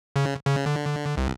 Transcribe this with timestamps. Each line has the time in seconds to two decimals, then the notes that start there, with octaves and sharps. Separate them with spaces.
0.16 C#3
0.46 C#3
0.66 D3
1.17 C2